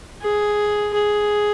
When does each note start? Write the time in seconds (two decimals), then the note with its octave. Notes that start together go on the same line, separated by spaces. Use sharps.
0.22 G#4
0.94 G#4